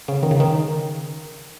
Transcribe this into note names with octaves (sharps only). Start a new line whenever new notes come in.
C#3
D#3
C#3
D#3